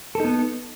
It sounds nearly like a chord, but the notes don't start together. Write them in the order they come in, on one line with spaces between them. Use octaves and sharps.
A4 D#4 B3